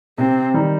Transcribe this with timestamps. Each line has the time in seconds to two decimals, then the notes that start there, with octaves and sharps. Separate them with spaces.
0.18 C3 C4
0.54 D#3 G3 D#4